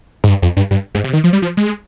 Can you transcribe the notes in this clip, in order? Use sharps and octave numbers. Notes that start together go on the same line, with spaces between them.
G#2
G2
F2
G2
G2
G#2
C3
D#3
F3
G3
F3
G#3